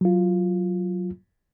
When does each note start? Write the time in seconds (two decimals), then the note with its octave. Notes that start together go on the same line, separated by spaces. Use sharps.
0.01 F#3 F4